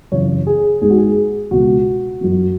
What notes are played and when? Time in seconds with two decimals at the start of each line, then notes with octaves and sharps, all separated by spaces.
0.12 F#2 C#3 E3 C#5
0.47 G#4
0.82 G#2 G#3 G#4
0.90 F#4
0.98 G#4
1.51 C#2 B2 G#3 F#4
2.21 F#2 F#3